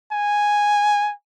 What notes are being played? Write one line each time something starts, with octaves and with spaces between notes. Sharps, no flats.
G#5